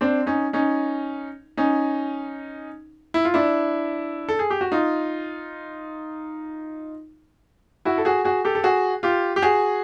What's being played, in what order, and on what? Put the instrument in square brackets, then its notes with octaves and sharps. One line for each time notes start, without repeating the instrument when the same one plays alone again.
[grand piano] C4 D4
C#4 D#4
C#4 D#4
C#4 D#4
E4
F4
D4 E4
A4
G#4
G4
F#4
D#4 F4
E4 F#4
A4
F#4 G#4
F#4 G#4
G4 A4
A4
F#4 G#4
F4 G4
G4
F#4 G#4